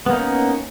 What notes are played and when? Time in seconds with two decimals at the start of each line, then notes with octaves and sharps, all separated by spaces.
0.06 B3
0.10 A#3
0.13 D#4
0.17 C#4